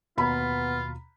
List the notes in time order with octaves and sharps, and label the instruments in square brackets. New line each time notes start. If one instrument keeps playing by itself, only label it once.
[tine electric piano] D#2 B2 [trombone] B3 [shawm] F4 [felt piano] A#5 B5 B6